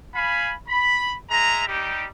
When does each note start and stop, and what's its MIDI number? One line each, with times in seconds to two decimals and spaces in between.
0.15 0.54 77
0.15 0.54 80
0.15 0.54 83
0.69 1.15 83
1.31 1.66 56
1.31 1.66 76
1.31 1.66 82
1.68 2.07 55
1.68 2.07 63
1.68 2.07 67